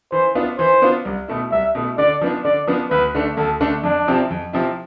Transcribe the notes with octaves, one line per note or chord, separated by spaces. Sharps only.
E3 C5
B3 D4 F4
E3 C5
B3 D4 F4
C2
B2 A3 E4
C2 E5
B2 A3 E4
D3 D5
F3 B3 D4
D3 D5
F3 B3 D4
D2 B4
D3 A3 D4
D2 A4
D3 A3 D4
F2 D4
C3 F3 C4 E4
F2
C3 F3 C4 E4